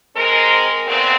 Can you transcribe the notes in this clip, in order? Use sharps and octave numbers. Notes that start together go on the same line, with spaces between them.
G#3 C4 A#4
D2 A#2 C#3 B3 C4